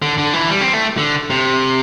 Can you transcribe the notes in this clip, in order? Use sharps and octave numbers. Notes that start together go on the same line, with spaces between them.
D3
D3
E3
G3
C4
A3
D3
C3